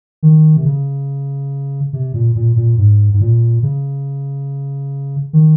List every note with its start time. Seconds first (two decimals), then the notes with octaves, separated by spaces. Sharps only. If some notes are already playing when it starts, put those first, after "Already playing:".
0.23 D#3
0.57 C3
0.65 C#3
1.93 C3
2.14 A#2
2.36 A#2
2.56 A#2
2.78 G#2
3.14 G#2
3.21 A#2
3.63 C#3
5.33 D#3